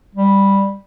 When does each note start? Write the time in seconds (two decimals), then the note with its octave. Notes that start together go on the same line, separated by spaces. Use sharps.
0.15 G3